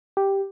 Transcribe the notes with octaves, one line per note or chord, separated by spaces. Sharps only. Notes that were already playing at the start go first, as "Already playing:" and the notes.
G4